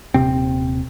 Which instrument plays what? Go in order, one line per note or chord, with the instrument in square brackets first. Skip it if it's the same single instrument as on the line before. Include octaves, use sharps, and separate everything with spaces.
[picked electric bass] D#1 C3 C4